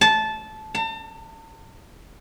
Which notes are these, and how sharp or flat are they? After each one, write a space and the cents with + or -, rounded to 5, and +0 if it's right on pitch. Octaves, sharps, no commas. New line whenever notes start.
A5 -15
A5 +40